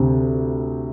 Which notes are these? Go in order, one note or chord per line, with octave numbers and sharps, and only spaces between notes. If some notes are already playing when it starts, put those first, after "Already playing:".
Already playing: D2 C3